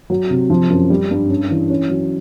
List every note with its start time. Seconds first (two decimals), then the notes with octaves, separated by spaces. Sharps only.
0.10 F#3
0.30 C3
0.50 F3
0.70 F#2
0.90 G3
1.11 G2
1.30 C#4
1.51 E3
1.70 C#4
1.89 F#3